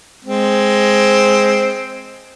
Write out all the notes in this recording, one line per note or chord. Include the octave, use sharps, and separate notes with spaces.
G#3 C4